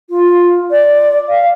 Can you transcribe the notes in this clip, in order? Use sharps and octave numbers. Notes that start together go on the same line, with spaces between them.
F4
D5
F5